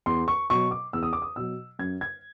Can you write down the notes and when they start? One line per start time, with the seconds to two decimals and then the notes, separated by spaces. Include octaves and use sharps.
0.06 E2 C6
0.28 C#6
0.50 B2 F#3 C#6
0.71 D6
0.93 E2 E6
1.03 D#6
1.13 D6
1.22 D#6
1.36 B2 F#3 E6
1.79 F#2 G#6
2.01 G#6